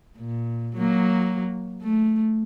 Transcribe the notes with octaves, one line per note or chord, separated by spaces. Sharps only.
A#2
F#3 A#3
A3